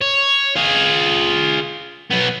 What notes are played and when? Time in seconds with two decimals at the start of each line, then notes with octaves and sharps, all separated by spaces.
0.01 C#5
0.57 F4 G#4
2.11 F#3 B3